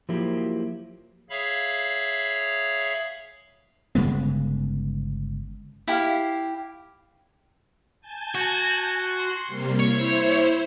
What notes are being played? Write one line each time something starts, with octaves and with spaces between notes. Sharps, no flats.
F3 F#3 A#3 E4 G4
G#4 C#5 E5 F5 B5
G1 C#3 G#3 B3
E4 G4 F5
G#5 A5 G6
F#4
C6
C3 G3 A#3
E4 C5 C#5